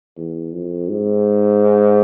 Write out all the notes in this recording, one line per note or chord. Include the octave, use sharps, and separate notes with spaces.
E2
F2
G#2